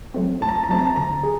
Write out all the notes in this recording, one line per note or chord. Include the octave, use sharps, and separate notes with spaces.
F#3 A3 C4
A2 A5
A#5
A5
A#5
F#3 A3 C4 A5
A#5
A5
D3 A#5
G#4